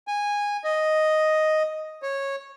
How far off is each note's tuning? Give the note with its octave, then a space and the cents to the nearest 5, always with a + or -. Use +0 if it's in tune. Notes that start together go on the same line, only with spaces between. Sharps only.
G#5 -15
D#5 +0
C#5 -15